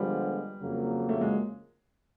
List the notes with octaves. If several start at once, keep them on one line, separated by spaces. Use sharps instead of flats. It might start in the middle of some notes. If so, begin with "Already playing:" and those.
Already playing: D3 F3 G3 G#3 B3
F2 C#3 F#3 A#3
A3
G#3